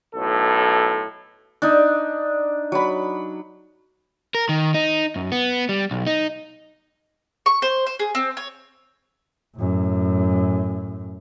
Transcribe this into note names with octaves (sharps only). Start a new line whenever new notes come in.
B1 A2 A4
D4 D#4
F#3 B5
A#4
D#3
D#4
F#2
B3
G3
B1
D#4
C#6
C5
C5
G#4
C4
C#5
F#2 A2